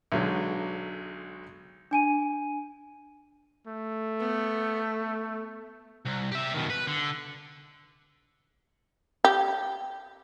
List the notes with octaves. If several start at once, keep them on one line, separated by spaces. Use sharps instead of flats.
B1 D3 F#3 G#3
D4 G#5 D#7
A3
B3
C2
G4 E5
B2 D#3
B4
D3
G4